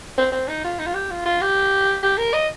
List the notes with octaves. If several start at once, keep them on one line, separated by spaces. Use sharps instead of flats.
C4
C4
D#4
F4
D#4
F4
G4
F4
F4
G4
G4
A#4
D#5